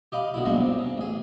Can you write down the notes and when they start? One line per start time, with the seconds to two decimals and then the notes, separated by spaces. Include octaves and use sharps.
0.12 G4 D#5 F5 B5
0.34 B2 D3 E4
0.46 B1 G2 G#3 A#3 B3
0.60 C3
0.78 C#3
0.98 A1 G#4